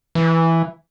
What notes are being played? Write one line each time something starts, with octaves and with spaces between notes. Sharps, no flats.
E3